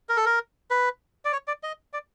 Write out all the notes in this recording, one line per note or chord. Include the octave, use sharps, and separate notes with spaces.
A#4
A4
A#4
B4
D5
C#5
D5
D#5
D5